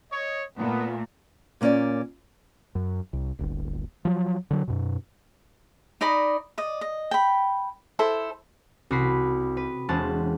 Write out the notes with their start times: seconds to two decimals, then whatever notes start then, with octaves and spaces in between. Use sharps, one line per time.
0.12 C#5 D#5
0.58 A#2 A3 B3
1.61 A#2 A#3 C#4 B4 D5
2.75 F#2
3.13 C2
3.39 D1 G1
4.05 F3 F#3
4.51 D3 F#3
4.68 F#2 B2
6.01 D#4 D5 D#5 B5
6.58 D5 D#5
6.81 D#5
7.11 G5 B5
7.99 E4 A4 C5
8.91 C2 F#4 B5 C7
9.57 B4
9.89 E1 G#3 C#4 C5 F#5 A5